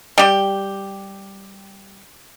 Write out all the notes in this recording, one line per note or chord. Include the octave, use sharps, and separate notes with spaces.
G3 G4